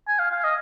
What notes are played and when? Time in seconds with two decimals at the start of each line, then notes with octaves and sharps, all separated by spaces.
0.08 G#5
0.19 F5
0.31 F5
0.44 D#5